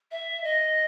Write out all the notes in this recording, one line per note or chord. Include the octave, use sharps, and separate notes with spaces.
E5
D#5